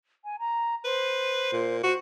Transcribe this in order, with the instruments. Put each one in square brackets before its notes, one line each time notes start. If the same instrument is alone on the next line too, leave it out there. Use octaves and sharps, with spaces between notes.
[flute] G#5
A#5
[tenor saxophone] B4 [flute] C5
[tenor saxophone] A#2
[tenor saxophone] F#4 [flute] C5